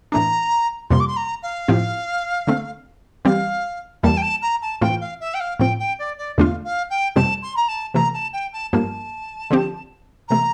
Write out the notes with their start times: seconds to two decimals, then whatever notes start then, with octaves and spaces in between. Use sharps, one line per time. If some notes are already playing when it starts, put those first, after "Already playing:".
0.12 A2 E3 A3 D4 A#5
0.90 F2 C3 G3 A#3 C6
1.00 D6
1.08 C6
1.16 A#5
1.43 F5
1.68 A2 F3 C4 E4 G4
2.47 D3 A3 C4
3.25 E3 G3 C4 G4 F5
4.03 E2 E3 G3 A#3 A5
4.17 G5
4.22 A5
4.42 A#5
4.62 A5
4.81 A2 E3 A3 C4 F4 G5
5.01 F5
5.20 E5
5.34 G5
5.40 F5
5.60 A2 F3 C4 G5
5.79 G5
5.99 D5
6.18 D5
6.38 E2 D3 A3 D4 F4 F5
6.64 F5
6.90 G5
7.16 F2 C3 G3 C4 G4 A5
7.42 C6
7.56 A#5
7.68 A5
7.94 C3 E3 A3 A#5
8.14 A5
8.33 G5
8.53 A5
8.72 G2 F3 A#3 A5
9.51 D3 F3 C4 G4
10.28 C3 E3 A3 A#5